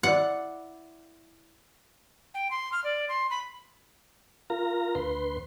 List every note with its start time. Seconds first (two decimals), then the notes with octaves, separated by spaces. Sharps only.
0.03 E4 D5 F#5
2.34 G5
2.50 C6
2.72 F6
2.84 D5
3.09 C6
3.30 B5
4.50 F4 A#4 A#5
4.95 D2 B4 C6